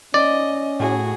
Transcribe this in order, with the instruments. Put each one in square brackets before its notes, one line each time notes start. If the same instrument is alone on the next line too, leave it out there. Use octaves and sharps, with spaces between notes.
[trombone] C#4 [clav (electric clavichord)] D5 [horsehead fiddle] D#5
[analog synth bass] A2 [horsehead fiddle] F#4 G#4